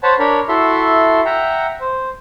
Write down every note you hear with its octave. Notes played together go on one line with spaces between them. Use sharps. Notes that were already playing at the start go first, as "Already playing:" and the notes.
C5 C#5 F#5 A5 B5
D4 A#4 C#5 B5
E4 F#4 A4 E5 C6
E5 F#5 G5 A#5
C5